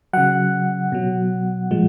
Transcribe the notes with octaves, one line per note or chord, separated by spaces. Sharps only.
C#3 F#3 F#5
B2 F#3
A#2 F3 G#3